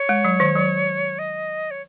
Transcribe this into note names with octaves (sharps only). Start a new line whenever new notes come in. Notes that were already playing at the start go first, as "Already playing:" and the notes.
Already playing: C#5
G#3
F#3
D#3
F#3
D#5
C#5